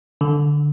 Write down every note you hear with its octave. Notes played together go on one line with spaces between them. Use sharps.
D3